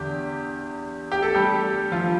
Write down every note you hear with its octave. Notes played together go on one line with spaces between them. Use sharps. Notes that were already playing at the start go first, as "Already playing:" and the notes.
Already playing: E2 D3 G4
G4
A4
G3 G4
F3 F4